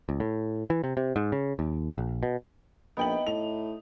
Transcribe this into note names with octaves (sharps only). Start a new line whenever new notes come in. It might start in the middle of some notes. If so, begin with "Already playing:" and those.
C#2
A2
E3
C3
C3
G#2
C#3
D#2
A#1
B2
A#1 B3 D#4 E5 G5 F#7
A2 F7